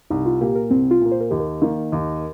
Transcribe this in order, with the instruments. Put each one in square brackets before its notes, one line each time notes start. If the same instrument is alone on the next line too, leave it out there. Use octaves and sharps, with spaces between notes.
[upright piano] C2 [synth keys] D#4
[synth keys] F4
[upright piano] A#2 A#3 [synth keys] G4
[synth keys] A#4
[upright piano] C2 [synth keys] C4
[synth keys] F4
[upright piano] A#2 A#3
[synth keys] C5
A#4
[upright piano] D#2 [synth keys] G4
[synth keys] A#4
[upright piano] D#3 A#3
D#2